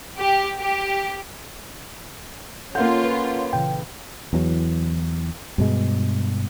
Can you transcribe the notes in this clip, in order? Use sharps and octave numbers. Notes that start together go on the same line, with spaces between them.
G4
G4
A#3 C#4 F4 A4 F5 F#5 G6
B4
A#2 C#3 E3 G5
E2 E3 F#3
G2 B2 G#3